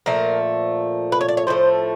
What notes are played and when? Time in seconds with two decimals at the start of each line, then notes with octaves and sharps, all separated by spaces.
0.06 A#2 F3 A3 A#4
1.12 B4
1.21 C#5
1.29 D5
1.37 C#5
1.47 A2 F3 A3 C5